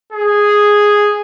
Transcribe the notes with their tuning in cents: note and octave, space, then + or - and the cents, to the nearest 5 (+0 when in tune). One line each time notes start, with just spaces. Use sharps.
G#4 -5